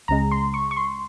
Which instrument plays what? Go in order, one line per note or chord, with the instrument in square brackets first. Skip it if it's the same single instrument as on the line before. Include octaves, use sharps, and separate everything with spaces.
[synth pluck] C#2 C#3 G#3 A#5
C6
C#6
C#6
C6